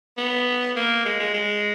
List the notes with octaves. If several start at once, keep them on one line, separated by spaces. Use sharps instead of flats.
B3
A#3
G#3
G#3
G#3